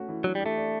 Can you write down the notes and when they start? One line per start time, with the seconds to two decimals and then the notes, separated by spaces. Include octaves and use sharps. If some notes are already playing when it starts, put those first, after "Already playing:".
Already playing: A3 C#4 F#4
0.09 E3
0.24 F#3 D4
0.35 G3
0.40 G4
0.46 A3
0.57 D5